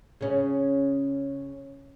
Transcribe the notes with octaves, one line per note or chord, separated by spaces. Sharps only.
C#3 C#4